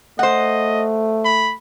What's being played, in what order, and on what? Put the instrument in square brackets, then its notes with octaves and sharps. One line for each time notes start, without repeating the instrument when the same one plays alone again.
[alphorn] A3 [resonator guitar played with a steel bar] C5 F#5 [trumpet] D#5
[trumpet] B5